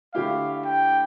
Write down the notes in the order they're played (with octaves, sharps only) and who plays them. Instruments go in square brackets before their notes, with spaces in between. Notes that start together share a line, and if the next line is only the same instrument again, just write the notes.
[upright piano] D3 A3 E4 G4 [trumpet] F5
[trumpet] G5